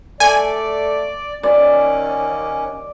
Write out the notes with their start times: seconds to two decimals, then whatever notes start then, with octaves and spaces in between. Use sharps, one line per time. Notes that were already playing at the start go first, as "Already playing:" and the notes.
0.20 A3 D5 G#5
1.43 D#2 C#4 D5